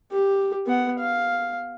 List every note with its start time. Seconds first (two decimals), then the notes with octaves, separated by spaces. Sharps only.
0.12 G4
0.67 B3 F#5
0.99 F5